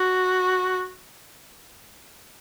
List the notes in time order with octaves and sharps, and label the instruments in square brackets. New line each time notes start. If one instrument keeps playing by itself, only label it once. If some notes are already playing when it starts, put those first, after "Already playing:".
Already playing: [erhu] F#4